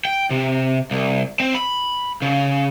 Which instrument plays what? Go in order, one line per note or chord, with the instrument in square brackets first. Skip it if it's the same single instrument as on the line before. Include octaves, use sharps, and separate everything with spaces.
[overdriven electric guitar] G5
C3
C2
C4
B5
C#3